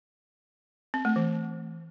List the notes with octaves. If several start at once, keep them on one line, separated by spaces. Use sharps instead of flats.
C4
A3
E3